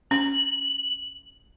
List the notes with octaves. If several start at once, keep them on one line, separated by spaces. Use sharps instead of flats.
C#4 F#7